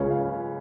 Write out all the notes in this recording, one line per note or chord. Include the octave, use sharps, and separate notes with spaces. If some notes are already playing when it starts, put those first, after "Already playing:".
Already playing: C#2 C#3 G#3 C#4 F4 C#5
F5